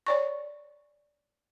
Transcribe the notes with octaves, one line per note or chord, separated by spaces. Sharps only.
C#5 D5 C#6